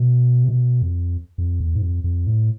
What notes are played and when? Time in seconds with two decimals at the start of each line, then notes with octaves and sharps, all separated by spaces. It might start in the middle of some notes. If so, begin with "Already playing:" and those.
Already playing: B2
0.44 C3
0.49 B2
0.82 F2
1.38 F2
1.60 E2
1.75 G#2
1.82 F2
2.04 F2
2.27 A2